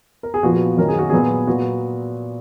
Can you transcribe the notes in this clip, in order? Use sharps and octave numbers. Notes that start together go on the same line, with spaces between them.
A#4
G#4
A#2 F3 B3 F#4
F#2 D#3 A#3 C#4 A#4
G#4
F#4
A#2 F#3 B3 G#4
A#2 F#3 B3 F#4